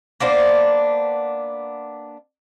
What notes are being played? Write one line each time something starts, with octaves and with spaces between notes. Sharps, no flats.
A#3 B3 D4 C5